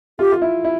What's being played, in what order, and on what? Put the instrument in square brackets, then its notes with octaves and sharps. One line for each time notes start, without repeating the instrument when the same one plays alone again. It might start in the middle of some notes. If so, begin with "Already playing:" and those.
[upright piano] F4 [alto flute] G4
[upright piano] F4
E4
E4